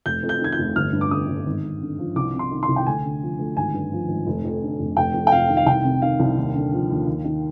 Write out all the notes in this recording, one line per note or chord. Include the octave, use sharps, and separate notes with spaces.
F1 G6
F2
G6
D#3 G#6
G6
F1
G1 F6
G2
D6
D3 D#6
G1
G#1
G2
D3
F3
C2 D6
C3
C6
D#3
C6
C2
G5
D2 G#5
D3
F3
D2
G#1 G#5
G2
F3
G#1
F1
F2
D3
F1
F1 G5
F2
G5
C3 F5
D#3
F5
C2 G5
C3
D#3 F5
C2
D#2
D3
F3
D#2
D#2
D#3